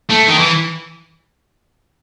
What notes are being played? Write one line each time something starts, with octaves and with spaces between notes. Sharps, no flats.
A3
D#3
E3